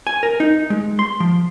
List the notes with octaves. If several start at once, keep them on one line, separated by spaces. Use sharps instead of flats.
G#5
A#4
D#4
G#3
C6
F3